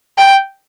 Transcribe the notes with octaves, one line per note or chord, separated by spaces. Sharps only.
G5